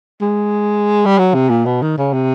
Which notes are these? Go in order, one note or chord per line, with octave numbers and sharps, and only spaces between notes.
G#3
G3
F#3
C3
A#2
B2
D#3
C#3
C3